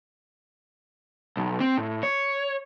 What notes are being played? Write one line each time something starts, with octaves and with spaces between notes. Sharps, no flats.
B1
C4
A2
C#5